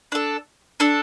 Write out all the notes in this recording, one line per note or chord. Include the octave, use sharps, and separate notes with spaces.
D4 A4
D4 A4